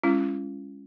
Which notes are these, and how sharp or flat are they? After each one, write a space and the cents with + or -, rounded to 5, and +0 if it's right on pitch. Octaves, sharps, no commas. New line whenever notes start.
G#3 -30 C#4 +0 F4 -45